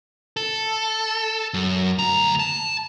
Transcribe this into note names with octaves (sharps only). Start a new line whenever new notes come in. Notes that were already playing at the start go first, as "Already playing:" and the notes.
A4
F#2
D2 A#5
A5